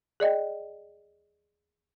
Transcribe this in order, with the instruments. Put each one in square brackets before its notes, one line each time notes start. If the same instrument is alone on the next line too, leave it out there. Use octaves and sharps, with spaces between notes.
[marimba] G#4 D5 D#5 G5